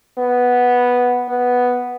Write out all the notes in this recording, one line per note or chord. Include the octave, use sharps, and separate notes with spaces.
B3
B3